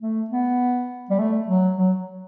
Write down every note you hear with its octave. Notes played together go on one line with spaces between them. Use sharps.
A3
B3
G3
A3
F#3
F#3